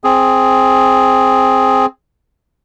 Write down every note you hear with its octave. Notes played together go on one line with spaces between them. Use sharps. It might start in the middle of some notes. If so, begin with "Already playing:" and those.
C4 G#4